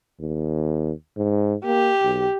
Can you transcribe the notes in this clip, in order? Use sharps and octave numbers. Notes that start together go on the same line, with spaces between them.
D#2
G#2
A#3 G4
B1